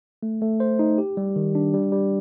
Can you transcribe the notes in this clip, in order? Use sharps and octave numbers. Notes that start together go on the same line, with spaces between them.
A3
A3
C5
D#4
G4
G3
D#3
D4
G3
G3